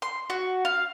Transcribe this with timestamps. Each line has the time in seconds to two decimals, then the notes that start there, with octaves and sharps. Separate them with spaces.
0.02 C6
0.30 F#4
0.65 F5